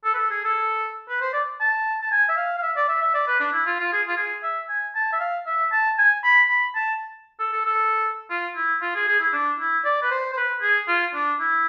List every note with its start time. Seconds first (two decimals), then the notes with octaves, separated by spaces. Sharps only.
0.04 A4
0.14 B4
0.18 A4
0.30 G#4
0.44 A4
1.09 B4
1.21 C5
1.33 D5
1.60 A5
2.02 A5
2.11 G#5
2.29 E5
2.37 F5
2.58 F5
2.62 E5
2.76 D5
2.88 E5
3.02 E5
3.14 D5
3.28 B4
3.40 D4
3.52 E4
3.66 F4
3.79 F4
3.92 G#4
4.08 F4
4.17 G#4
4.43 E5
4.69 G#5
4.95 A5
5.12 E5
5.20 F5
5.47 E5
5.72 A5
5.98 G#5
6.24 B5
6.49 B5
6.75 A5
7.40 A4
7.52 A4
7.65 A4
8.30 F4
8.56 E4
8.82 F4
8.95 G#4
9.08 G#4
9.20 E4
9.33 D4
9.60 E4
9.85 D5
10.02 B4
10.11 C5
10.33 C5
10.37 B4
10.62 G#4
10.88 F4
11.14 D4
11.40 E4